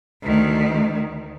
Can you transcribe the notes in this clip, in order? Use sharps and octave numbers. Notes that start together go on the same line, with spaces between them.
D2 D#3